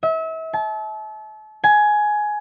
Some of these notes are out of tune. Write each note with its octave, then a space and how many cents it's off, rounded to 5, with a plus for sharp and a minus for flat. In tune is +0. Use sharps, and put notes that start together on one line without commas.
E5 -35
A5 -35
G#5 +15